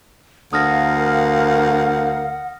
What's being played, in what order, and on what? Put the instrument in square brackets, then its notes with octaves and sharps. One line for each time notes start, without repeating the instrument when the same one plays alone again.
[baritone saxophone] D2 [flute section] A#4 F5 [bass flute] F#5 [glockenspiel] D#6 F6 A#6